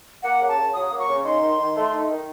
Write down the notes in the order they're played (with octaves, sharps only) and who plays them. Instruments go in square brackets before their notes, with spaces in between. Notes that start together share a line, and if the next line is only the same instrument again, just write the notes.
[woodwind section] A#3 [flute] F#5
[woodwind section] C#3
[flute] A5
[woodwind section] C#3
[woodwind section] F#3 [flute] D#6
[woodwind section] A#3
[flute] C#6
[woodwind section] C#3
[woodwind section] D#4 [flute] C6
[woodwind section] D#3
D#3
A3
D#4
D#3